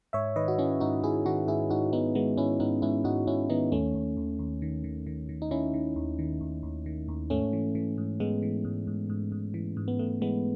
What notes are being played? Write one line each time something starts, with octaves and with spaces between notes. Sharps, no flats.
G#2 C#5 E5
D#3 B4 D#5
F#4
D#3 C#4 E4
G#2 D#4 F#4
G#2 E4 G#4
D#3 D#4 F#4
G#2 E4 G#4
G#2 D#4 F#4
G#2 B3 D#4
D#3 G#3 B3
G#2 C#4 E4
G#2 B3 D#4
G#2 C#4 E4
G#2 D#4 F#4
G#2 C#4 E4
D#3 B3 D#4
D#2 A3 C#4
D#2
D#2
D#2
D#3
D#3
D#3
D#3
D#4
D#3 C#4 E4
D#3
D#2
D#3
D#2
D#2
D#3
D#2
G#2 A3 C#4
E3
E3
G#2
G#2 G#3 B3
E3
G#2
G#2
G#2
G#2
E3
G#2
B3
G#2 A3
E3 G#3 B3